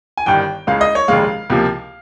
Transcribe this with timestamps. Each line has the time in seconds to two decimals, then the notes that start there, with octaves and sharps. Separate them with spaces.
0.17 G#5
0.26 G1 G2 D#3 G5
0.67 C#2 C#3 G#3 F5
0.81 D#5
0.95 C#5
1.08 F1 D#2 C#3 G#3 F5
1.50 C#2 C3 F3 A#3